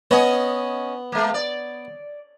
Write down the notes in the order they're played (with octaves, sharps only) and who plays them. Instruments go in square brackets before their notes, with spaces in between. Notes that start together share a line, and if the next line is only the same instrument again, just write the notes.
[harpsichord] B3 [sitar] C#4 C#5 D#5
[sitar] G#3 A#3
D5